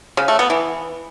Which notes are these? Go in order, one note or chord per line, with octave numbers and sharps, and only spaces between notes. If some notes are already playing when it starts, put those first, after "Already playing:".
C#3
A3
B3
E3